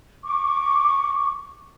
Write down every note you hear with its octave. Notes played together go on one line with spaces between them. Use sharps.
C#6 D6